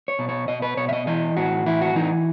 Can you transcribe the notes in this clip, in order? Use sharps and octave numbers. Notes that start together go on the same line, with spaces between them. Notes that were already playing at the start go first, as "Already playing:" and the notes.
C#5
B2
C#5
B2 D#5
B4
B2 C#5
E5
D#5
E3 D#5
A2 F#4
E3 E4
F#4
E3 D#4